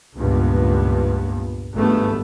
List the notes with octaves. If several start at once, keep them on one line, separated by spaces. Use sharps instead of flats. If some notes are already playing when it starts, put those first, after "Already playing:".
C#2 G2 A#2 B3
G#1 G2 A3 B3